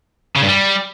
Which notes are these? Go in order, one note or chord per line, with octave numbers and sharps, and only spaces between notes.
C#3
G2
G3